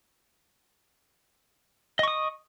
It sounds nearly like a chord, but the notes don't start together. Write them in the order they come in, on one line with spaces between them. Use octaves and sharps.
D#5 C#6 D#6